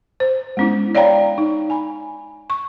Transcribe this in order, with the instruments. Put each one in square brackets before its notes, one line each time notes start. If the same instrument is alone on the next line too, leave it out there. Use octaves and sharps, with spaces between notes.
[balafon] C5
G#3 B3 C#4 D4 E4
C#5 D5 F5 G5 A#5 B5
D#4
G#5 B5
C#6